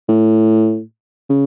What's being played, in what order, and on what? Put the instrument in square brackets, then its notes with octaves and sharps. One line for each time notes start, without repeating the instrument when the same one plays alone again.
[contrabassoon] A2
C#3